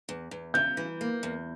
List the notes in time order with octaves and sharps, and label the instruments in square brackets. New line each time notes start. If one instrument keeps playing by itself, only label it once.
[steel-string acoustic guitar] E2
E2
[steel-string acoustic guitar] C#3 [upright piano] G6
[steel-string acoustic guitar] E3
A#3
E2